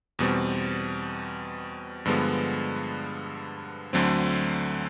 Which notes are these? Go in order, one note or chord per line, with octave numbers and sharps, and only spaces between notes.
E2 B2 G3 C4
G2 D3 F3 G#3 B3
D2 D3 F#3 A3 C4